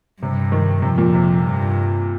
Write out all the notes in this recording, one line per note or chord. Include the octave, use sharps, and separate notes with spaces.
G2 C3
D#3
F2 C3
A#2
C3
G2